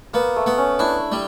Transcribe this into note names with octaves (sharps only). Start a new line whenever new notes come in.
A#3 B3
A3
B3
C#4
D4 E4
G3